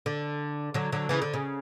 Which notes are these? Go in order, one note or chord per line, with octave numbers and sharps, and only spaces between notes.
D3
D3 F#3
D3 F#3
C#3 E3
D3
C#3